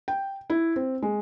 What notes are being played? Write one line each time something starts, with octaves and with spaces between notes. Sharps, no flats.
G5
E4
C4
G#3